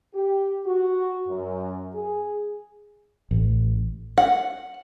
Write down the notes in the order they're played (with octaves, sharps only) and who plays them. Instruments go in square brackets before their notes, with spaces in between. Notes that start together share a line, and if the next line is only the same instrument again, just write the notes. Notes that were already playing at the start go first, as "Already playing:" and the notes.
[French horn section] G4
F#4
F#2
G#4
[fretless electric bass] A1
[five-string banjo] F#5